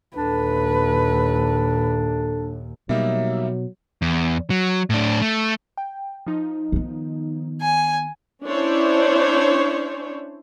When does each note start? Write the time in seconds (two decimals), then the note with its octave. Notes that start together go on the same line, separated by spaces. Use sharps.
0.17 D#2 A#2 D4 A4 B4
2.89 B2 F#3 G3 A#3 D#4 E5
4.02 E2
4.50 F#3
4.90 A2 D4
5.22 A3
5.77 G5
6.27 F3 D#4
6.72 D#3 B3
7.61 G#5
8.44 C#4 D4 E4 C5 C#5